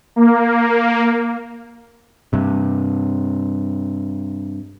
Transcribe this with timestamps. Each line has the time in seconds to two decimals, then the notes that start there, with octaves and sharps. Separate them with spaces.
0.16 A#3
2.33 G2 C3